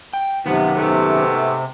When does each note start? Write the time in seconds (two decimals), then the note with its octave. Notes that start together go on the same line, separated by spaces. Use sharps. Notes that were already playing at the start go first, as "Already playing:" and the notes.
0.13 G5
0.46 F#2 C3 D#3 F3 B3
0.75 G#2 A3 B3